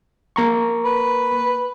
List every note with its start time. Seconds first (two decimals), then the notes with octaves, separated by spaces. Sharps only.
0.36 A#3 A#5 C#6
0.85 B4